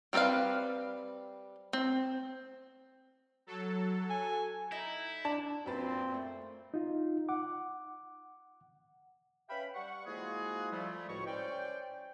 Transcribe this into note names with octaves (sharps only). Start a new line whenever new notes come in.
G3 C4 A4 B4 F5
C4
F#3 A4
G#5
D#4 E4
D4 A5
F#2 A#2 C4 B4 A6
A3
D#4 F4
F#5 D6
C#4 B4 E5 F5 G5 B5
G3 F#5 C#6
F3 G#3 A#3 E4 F#4 G#4
F3 G3 A3
C#2 A2 G#3 F#4 C#5 C#6
C#4 C5 D5 G5